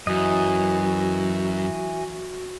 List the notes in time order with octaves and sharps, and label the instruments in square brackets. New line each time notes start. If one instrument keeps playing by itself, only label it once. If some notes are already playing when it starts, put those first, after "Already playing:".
[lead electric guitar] F#2 [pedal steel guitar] E3 D#5 [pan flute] F#4